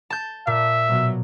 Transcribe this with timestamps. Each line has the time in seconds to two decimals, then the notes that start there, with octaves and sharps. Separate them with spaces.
0.10 A5 G6
0.47 A#2 E5
0.88 B2 F#3